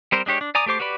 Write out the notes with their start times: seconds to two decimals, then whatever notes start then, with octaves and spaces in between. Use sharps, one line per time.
0.12 G3 C4 A#4 C5
0.26 G#3 D4 G4 C#5
0.41 D4
0.55 D5 G#5 A#5 D6 D#6
0.66 A3 G4 C5 D6
0.79 F#4 G4 B4 D5 B5